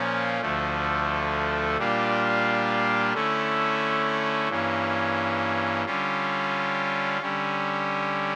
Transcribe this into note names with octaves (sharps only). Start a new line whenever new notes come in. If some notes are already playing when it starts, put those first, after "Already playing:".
Already playing: A#2 F3 A#3 C#4
D2 D3 F3 A3
A#2 G3 A#3 D4 F4
D3 A3 C#4 E4
G2 E3 A#3 C#4
D3 G3 C#4 F4
D3 G3 C#4